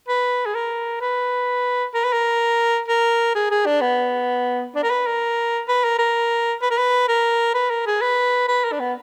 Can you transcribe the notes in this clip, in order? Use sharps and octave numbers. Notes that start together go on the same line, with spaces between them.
B4
G#4
A#4
B4
A#4
B4
A#4
A#4
G#4
G#4
D4
B3
D4
A#4
B4
A#4
B4
A#4
A#4
B4
A#4
B4
A#4
B4
A#4
G#4
B4
B4
A#4
D4
B3